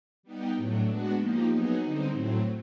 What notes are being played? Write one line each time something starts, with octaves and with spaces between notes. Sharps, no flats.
G3 B3 D#4 G4
A2 F#3 A3 D4
G#3 B3 D4 F#4
F3 A#3 D#4 G4
F#3 B3 D#4 G#4
D3 G3 C4 D#4
A2 F#3 A3 C4